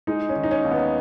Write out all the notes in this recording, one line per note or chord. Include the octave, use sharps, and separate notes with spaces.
G#3 D#4
C#4
D#3
D#4
C#4
D#2
B3